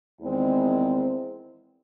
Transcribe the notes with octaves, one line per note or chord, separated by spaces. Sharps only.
E2 D#3 G#3 C4